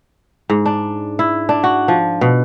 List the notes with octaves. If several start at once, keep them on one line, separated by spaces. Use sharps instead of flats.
G#2
D4
E4
D4
F#4
F3
B2